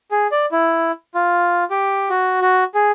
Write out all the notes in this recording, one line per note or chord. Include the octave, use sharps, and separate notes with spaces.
G#4
D5
E4
F4
G4
F#4
F#4
G#4